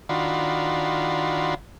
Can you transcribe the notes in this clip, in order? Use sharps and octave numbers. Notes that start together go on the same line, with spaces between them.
D#3 D4 F4 F#4 B5 C6